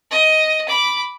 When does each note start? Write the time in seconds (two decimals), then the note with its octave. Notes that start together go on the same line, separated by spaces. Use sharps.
0.11 D#5
0.68 B5 D6